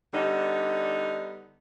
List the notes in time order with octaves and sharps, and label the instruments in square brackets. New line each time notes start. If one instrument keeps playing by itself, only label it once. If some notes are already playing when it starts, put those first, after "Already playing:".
[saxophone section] D3 G3 B3 D4 D#4